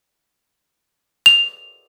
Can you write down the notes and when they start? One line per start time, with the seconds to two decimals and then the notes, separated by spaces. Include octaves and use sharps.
1.26 F7